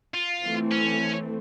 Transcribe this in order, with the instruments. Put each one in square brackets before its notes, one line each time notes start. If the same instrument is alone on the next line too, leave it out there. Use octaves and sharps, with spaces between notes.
[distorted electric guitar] F4
[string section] E3 A3 C4
[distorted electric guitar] C#4